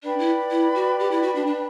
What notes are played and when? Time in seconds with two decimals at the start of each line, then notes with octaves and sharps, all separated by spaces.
0.03 D4 B4 D5 G5 B5
0.19 E4
0.51 E4
0.75 F#4
0.99 G4
1.11 E4
1.23 F#4
1.35 D4
1.47 D4